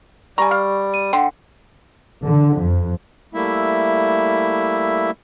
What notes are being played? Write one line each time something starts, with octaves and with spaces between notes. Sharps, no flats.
G3 G#5 A#5 C#6
F5
D#7
D3 F#5 G5 C6
D3
F2
G3 A3 A#3 E4 E5